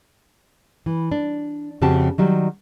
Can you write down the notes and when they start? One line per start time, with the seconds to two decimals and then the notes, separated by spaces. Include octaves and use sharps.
0.86 E3
1.12 D4
1.82 F2 C#3 C4 F#4 G4 A5
2.18 D#3 F#3 G3